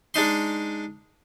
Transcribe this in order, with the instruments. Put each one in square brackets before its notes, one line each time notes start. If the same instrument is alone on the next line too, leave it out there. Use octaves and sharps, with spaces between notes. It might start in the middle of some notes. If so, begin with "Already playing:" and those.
[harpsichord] G#3 D4 D#4 C6